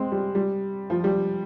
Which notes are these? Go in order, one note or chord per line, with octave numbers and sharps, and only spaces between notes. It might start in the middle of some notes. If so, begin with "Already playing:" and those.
Already playing: G#3 C4
G3
G3
F3
G3